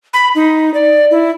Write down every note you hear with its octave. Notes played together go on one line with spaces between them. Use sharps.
B5
D#4
D5
E4